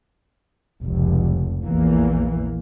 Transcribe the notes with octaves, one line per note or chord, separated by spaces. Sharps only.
F1 C#2
A#1 E2 E3 A#3